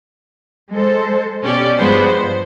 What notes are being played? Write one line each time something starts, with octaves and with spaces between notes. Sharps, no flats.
G#3 A4 C5
B2 C#4 G4 D5
G2 F3 G#3 B3 C5
C5